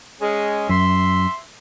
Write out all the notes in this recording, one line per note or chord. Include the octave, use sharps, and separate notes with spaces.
G#3 C#4
F#2 E5 C6